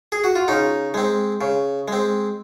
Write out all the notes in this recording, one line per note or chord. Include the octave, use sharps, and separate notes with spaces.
G#4
F#4
F4
C#3 D#4
G#3 C4
C#3
G#3 C4